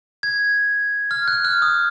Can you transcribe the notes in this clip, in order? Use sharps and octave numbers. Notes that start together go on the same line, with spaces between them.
G#6
F6
F#6
F6
D#6